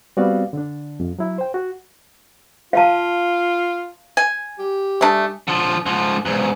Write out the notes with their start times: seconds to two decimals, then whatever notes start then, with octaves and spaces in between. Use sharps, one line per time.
0.17 G3 B3 C4 F#4 D5 F5
0.53 D3 D4
1.00 F2
1.19 F#3 E4
1.38 C5 G5
1.54 F#4
2.73 F4 F5 A5
4.17 G#5
4.59 G4
5.01 A3 D4 G#5 D#6
5.48 D3 F3
5.86 G#2 F3
6.25 E2 G#2